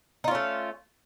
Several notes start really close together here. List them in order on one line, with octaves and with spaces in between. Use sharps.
D#4 F4 C#4 A3